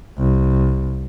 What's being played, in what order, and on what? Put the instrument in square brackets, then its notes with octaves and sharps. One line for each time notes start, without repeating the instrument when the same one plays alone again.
[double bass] C2